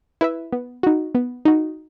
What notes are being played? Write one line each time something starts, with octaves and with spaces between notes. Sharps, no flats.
E4 B4 E5
B3
D#4 F#4
B3
D#4 F#4